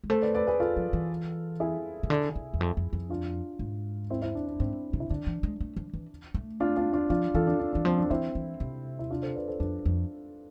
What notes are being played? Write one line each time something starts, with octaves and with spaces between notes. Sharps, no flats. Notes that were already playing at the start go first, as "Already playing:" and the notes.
G#3
A3 A4 C5
B4 D5
B4 D5
G#4 B4
F4 A4
F3
E3
E4 G#4
C3
D3
C3
E2
F2
F2
F2
D4 F4
G#2
C4 E4
C4 E4
D4
D4
G#2 C4
C3
E4
D3 D4
E3
G#3
A3
F3
E3
A3
D4 F4
D4 F4
D4 F4
F3 D4 F4
E3 F4 A4
D4
D4
E3 D4
F3 C4
D4
E3 C4 E4
E3
C3
E4
D4 F4
A4 C5
B4 D5
A4 C5
F2 D4
F2